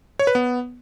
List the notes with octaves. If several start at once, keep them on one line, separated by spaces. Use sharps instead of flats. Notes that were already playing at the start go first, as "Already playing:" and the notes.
C#5
B4
B3